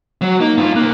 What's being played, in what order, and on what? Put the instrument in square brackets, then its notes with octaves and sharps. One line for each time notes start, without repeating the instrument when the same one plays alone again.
[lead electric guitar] F#3
[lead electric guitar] A#3 [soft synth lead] D#4
[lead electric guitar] G2 F4
[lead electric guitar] C2 A#3 [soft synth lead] F#6